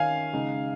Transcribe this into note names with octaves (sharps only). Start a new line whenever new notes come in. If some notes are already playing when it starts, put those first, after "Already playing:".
Already playing: D#3 C#4 F5 G#5
C#3 G#3 D#4